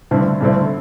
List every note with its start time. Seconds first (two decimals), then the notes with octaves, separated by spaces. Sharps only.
0.11 G2 D3 A3 C4 E4
0.41 G2 D3 A3 C4 E4